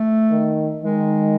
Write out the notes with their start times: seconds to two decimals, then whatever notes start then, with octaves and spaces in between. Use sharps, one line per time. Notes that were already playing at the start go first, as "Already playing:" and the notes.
Already playing: A3
0.31 D#3
0.84 D#3 G#3